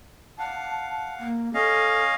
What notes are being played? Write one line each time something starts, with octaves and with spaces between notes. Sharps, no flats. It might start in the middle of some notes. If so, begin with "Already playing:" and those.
F5 F#5 A5
A#3
C#4 A4 D#5 F5